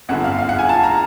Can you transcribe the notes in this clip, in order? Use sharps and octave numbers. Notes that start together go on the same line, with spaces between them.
G1 F#2 D3 F#5
F5
F5
F#5
G#5
A5
A#5